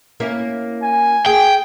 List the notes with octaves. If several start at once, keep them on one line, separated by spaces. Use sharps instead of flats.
A#3 C#4 E4
G#5
G#4 G5